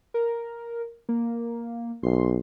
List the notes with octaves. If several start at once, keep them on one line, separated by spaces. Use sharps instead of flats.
A#4
A#3
B1 C6